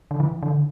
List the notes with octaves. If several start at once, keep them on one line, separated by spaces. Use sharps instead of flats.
D3
E3
D3